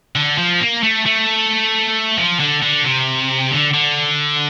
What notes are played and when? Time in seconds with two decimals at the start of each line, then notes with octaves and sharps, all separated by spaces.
0.15 D3
0.38 F3
0.61 A#3
0.83 A3
1.06 A3
2.17 F3
2.39 D3
2.62 D3
2.84 C3
3.51 D3
3.73 D3